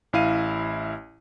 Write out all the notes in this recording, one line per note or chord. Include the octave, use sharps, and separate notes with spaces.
A1 E4 F5 D#7